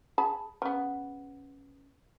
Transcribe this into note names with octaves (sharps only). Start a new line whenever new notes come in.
G#4 A5 B5
C#3 B3